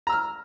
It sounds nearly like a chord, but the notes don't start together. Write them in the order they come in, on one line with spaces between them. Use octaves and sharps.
A#5 E6 F6